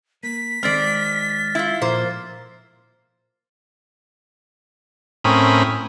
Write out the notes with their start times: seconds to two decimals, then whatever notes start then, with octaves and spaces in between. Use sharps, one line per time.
0.23 A#3 B6
0.63 D#3 G#3 C4 D5 F6 A6
1.55 E4 F4
1.81 A#2 F3 A3 A#3 C5
5.24 A2 C4 C#4 A#4 B5 D#6